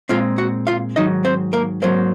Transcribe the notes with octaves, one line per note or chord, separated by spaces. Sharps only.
A#2 G#3 C4 F4 F5
F#4 F#5
F4 F5
G#2 D#3 F#3 D#4 D#5
C4 C5
A#3 A#4
G#2 F#3 A#3 C4 C5